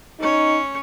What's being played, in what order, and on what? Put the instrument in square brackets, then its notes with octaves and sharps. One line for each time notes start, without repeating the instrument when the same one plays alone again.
[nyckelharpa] C#4 C#5 [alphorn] D#4